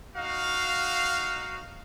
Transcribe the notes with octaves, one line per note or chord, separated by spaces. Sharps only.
D#4 F#4 F5